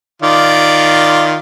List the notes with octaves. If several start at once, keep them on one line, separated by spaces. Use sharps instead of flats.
D#3 F4 D5